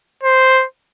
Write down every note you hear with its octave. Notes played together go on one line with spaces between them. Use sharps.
C5